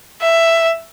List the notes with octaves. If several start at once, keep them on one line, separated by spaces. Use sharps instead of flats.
E5